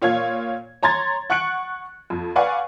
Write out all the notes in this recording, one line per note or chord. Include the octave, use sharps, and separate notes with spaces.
A#2 F4 C#5 F5 G#6
C#5 A#5 C6 G#6 A6
F#5 C#6 F#6 C#7 D7 F#7
F2
B4 D5 F5 F#5 G#5 C#6